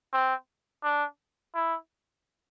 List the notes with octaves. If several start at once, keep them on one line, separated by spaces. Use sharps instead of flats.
C4
D4
E4